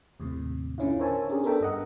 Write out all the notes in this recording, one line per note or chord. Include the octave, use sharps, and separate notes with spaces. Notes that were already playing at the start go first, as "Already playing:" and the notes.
D#2 A2 C3
A2 D3 C#4 E4 F4
A#4 C5 C#5 E5 G#5 A5
C#4 D4 G4 G#4
B3 D4 A4 A#4 E5 G5
G2 D#5 F#5